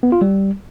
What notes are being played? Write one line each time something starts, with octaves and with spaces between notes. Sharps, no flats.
B3
F4
G3